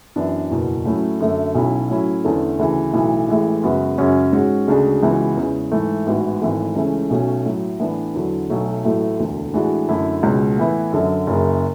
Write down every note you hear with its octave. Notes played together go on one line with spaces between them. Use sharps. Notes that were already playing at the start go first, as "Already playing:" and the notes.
F#2 E3 B3 D4
F#1 E2 B2
A2 F#3 A3 C#4 E4
F#2 D3 A3
B1 B2 F#3 C#4 E4
A2 F#3 C#4 E4
E2 D3 A3 C#4
D2 C#3 E3
B1 A2 E3
A1 A2 E3 G#3
F#2 C#3 G#3 B3 F#4
F#2 C#3 G#3 C#4 F#4
G#2 G#3 C#4 F#4
D2 C#3 G#3 D4 F#4
C#2 C#3 E3 B3 F#4
E2 C#3 G#3
G#2 E3 A3
A1 G#2 E3 B3 F#4
G#1 G#2 E3 A3
C#2 C#3 E3 A3 C#4
B1 B2 A3 C#4
A2 F#3 A3
A2 E3 B3 D4
E2 D3 F#3
B1 B2 F#3 A3
A1 A2 F#3 A3
E1 D2 D3
A2 E3 G#3 D4 F#4
F#2 D3 A3 E4
C#2 B2 G#3 C#4
A2 E3 B3 E4
F#2 D3 F#3
F#1 F#2 C#3